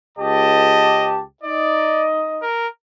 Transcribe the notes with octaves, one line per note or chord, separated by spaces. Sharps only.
C#2 G4 D#5 A5
D#4 D5 D#5
A#4